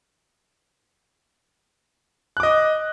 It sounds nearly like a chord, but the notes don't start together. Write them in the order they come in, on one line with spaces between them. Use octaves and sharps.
F#6 D6 D#5